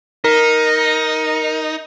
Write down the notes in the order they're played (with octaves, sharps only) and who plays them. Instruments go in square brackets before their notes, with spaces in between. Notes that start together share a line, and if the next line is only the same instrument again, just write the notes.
[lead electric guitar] D#4 [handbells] A#4